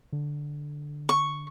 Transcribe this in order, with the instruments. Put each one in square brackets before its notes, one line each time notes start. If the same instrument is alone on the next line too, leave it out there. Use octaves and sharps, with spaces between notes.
[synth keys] D3
[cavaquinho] C#6